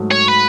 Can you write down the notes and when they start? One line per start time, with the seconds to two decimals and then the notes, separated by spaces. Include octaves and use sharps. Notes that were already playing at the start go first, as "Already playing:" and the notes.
Already playing: G#2 F#3 A3
0.11 C#5
0.28 B4